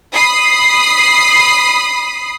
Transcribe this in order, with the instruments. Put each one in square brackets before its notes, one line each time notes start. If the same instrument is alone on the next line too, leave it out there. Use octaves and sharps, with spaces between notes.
[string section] B5 D#6 C7